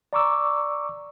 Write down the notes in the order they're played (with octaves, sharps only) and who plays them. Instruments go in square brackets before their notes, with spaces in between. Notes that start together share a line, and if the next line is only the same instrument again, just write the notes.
[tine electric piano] D5 A#5 C#6 D6 E6